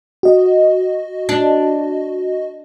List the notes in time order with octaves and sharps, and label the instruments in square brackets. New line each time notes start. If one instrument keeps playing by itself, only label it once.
[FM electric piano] F#4 D#5
[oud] D4